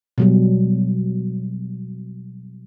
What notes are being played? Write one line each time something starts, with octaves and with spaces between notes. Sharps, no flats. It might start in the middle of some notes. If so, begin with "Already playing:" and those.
B2 F#3 G3